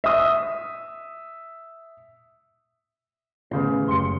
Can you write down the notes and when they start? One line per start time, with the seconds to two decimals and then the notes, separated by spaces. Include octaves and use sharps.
0.04 E5 D#6
3.51 A2 C#3 B3 G4 C5
3.88 F#1 G4 C6 C#7